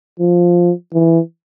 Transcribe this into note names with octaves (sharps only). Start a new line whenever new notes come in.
F3
E3